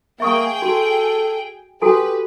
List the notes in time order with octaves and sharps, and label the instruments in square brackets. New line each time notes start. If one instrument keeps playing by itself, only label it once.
[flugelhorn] A#3 [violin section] G#4 G5 [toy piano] E5 C#6 D#6
[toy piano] F#4 [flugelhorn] A4
[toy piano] F#4 A4 G#5 [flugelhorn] G4 [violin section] B4